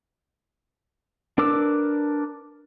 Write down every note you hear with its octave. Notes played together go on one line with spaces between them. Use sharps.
D4 A#4 B4 D6 E6